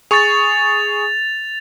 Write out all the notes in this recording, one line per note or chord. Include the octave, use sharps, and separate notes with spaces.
G#4 C#6 A6 F7